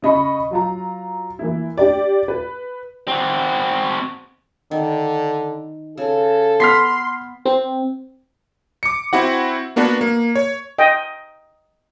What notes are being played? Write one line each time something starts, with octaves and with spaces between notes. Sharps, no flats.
C#3 D#5 B5 C#6
F#3 F4 A#5
E3 A#3 E4
D4 G4 D5
B4
C4 F#4
D3 D#3
C#3 A4
B3 C6 F6 B6 C7
C4
D6 C#7
C4 E4 F#4 F#5
A#3 B3 D4 F#4
A#3
C#5
D#5 G5